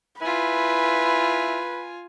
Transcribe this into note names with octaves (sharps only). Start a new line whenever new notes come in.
E4 F4 B4 G#5